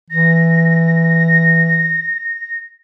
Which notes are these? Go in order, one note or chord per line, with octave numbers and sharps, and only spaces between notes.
E3 A#6